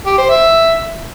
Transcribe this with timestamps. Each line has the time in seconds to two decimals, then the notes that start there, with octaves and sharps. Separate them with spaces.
0.06 G4
0.18 C5
0.30 E5